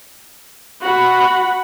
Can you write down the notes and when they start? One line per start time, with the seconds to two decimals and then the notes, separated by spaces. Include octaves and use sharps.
0.83 F#4 F#5 B5